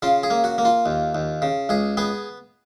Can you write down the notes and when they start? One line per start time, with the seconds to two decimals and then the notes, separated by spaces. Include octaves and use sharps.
0.02 C#3 F4
0.23 G#4
0.30 A#3
0.44 F#4
0.58 A#3
0.65 F4
0.86 D#2
1.15 D#2
1.42 C#3
1.69 C#2 G#4
1.97 B3 G#4